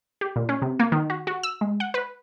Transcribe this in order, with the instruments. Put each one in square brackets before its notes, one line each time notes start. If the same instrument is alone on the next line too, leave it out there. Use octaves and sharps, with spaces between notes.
[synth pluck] G4
A#2
C#4
C3
A#3
D#3
F#4
F#4
E6
G#3
F#5
B4